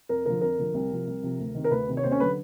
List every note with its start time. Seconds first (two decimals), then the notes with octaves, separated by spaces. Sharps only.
0.09 F2 A#4
0.26 D3 F3 A#4
0.41 F2 A#4
0.58 D3 F3
0.74 C2
0.90 C3 F3
1.07 C2
1.23 C3 F3
1.40 D2
1.55 C3 D#3
1.64 A#4
1.71 D2 B4
1.88 C3 D#3
1.97 C#5
2.03 D#2 C4 C5
2.11 C#4 C#5
2.20 D3 F#3 B4